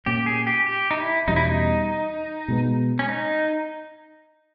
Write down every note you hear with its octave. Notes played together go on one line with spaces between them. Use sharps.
A#2 A#3 C#4 G4
G#4
G4
G4
D#4
E4
E2 B2 G3 C#4 D#4
E4
D#4
B2 G#3 B3
C#4
D#4